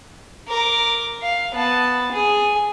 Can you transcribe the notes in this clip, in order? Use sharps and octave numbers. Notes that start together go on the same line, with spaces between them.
A#4 D6
F5
B3 A5
G#4 G#5